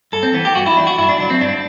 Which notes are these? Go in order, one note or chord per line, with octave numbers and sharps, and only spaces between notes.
G2 A4
C4
E3 B3
G4
G2 F#4
E4
E3 D4
F#4
G2 E4
D4
D3 F#3 D4
C4
G2 D4